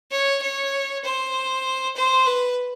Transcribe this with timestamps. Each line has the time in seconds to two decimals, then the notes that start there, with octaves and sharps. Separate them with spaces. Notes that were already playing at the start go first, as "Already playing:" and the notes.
0.11 C#5
0.42 C#5
1.04 C5
1.96 C5
2.26 B4